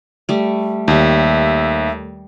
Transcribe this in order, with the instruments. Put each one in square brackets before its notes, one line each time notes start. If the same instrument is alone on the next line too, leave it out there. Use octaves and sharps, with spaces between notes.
[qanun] G3 A3
[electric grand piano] D#2 [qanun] G3 A4 [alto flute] E5